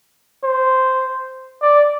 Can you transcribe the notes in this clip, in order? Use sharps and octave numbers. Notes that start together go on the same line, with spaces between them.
C5
D5